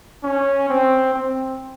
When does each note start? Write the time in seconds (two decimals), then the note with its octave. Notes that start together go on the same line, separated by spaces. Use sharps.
0.23 C#4
0.69 C4
1.14 C4